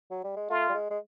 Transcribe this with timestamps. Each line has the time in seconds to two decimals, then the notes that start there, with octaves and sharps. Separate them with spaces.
0.10 F#3
0.24 G3
0.36 G#3
0.50 A3 F4
0.69 G3
0.74 G#3
0.90 G#3